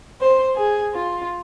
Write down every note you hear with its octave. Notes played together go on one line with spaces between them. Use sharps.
C5
G#4
F4